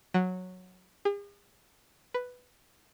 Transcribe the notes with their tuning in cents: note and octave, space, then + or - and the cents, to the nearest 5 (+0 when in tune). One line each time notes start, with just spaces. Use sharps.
F#3 -10
G#4 -45
B4 +5